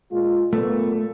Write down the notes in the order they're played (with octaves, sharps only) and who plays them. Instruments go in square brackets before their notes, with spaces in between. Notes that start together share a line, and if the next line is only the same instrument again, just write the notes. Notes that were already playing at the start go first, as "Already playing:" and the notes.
[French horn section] A#2 G#3 F4
[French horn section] A#2 B3 [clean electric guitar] A3